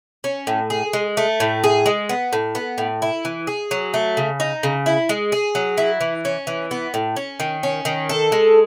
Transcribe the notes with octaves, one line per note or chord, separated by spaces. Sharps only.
C#4
A2
G#4
G#3
A3
A2
G#4
G#3
B3
A2
B3
A2
E4
E3
G#4
F#3
A3
C#3
D#4
C#3
E4
G#3
G#4
F#3
E4
E3
C#4
E3
B3
A2
C#4
D#3
C#4
D#3
A4
G#3